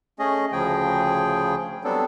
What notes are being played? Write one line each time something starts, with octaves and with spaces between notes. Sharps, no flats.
A3 C#4 G#4 D#5
D2 C#3 F3 G#4 G5
F#3 G3 B3 C4 D4 A4